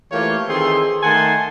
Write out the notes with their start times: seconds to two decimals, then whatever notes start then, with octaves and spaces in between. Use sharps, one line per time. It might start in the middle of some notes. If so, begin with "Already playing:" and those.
0.11 E3 A3 A#3 F4 G4 C#5
0.48 D#3 E3 C4 G#4 A4 C6
1.02 D#3 A3 F#5 G#5 A5 C6